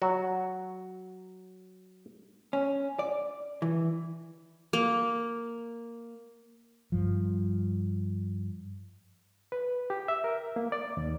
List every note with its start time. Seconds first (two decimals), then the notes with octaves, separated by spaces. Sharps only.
0.02 F#3 F#4
2.53 C#4
2.99 D5
3.62 E3
4.73 A#3
6.92 G2 F3
9.52 B4
9.90 G4
10.08 E5
10.24 A#4
10.56 A#3
10.72 D5
10.97 D#2